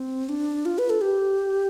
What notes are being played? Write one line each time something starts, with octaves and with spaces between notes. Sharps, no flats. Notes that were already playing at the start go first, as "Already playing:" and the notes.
Already playing: C4
D4
F4
B4
A4
G4